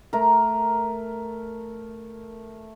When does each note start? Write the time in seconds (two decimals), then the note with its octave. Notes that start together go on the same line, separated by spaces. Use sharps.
0.13 A3 A#4